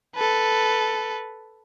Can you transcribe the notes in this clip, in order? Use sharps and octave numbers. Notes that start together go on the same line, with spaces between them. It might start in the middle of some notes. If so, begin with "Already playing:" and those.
A4 B4